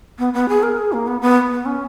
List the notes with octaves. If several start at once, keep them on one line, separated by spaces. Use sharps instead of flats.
B3
B3
G#4
A#4
G#4
A#3
B3
B3
B3
C#4